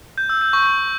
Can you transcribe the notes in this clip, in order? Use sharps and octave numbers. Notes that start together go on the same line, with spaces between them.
G6
E6
G6
C#6